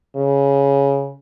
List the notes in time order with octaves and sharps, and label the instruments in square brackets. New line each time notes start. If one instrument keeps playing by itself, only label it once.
[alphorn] C#3